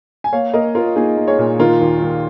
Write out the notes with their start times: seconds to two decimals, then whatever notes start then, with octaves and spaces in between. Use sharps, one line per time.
0.24 G#5
0.33 A#3 C#5 F5
0.54 A#3 A#4 D#5
0.75 A#3 F4 A#4
0.96 A#3 D#4 G#4
1.17 A#3
1.28 G#4 C#5
1.38 A#2
1.59 D#3 F4 A#4
1.81 D#2
2.02 D#2